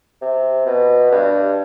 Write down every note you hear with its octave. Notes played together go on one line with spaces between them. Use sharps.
C3
B2
G2